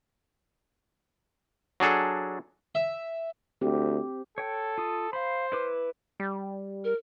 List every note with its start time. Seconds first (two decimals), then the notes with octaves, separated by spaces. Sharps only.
1.80 F#3 D4 G#4 A4
2.75 E5
3.61 D2 C4 G4
4.38 A4 C#5 G5
4.78 F4 D#6
5.13 C5 F5 B5
5.52 E4 B4 D6
6.20 G3
6.84 A#4